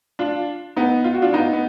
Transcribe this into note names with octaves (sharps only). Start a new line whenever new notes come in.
D4 F4
B3 D#4
F4
F#4
D4 F4
B3 D#4
B3